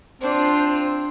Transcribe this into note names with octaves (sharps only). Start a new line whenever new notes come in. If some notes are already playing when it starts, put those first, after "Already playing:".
C4 D4 F4 C5